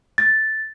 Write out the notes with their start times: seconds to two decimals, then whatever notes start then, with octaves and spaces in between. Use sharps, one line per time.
0.18 A6